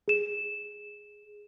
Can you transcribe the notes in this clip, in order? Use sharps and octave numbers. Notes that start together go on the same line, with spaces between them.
G#4 E7